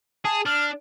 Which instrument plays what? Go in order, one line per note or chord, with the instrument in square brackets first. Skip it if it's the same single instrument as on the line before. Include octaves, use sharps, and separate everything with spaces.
[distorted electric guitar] G#4 [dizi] A5
[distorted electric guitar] D4 [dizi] F6